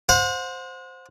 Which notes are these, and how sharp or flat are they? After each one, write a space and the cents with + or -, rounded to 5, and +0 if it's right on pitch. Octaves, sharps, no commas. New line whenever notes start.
C5 +0 F#5 -40